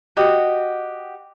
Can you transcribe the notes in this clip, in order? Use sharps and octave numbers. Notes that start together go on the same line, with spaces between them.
F#4 G4 D#5 F#5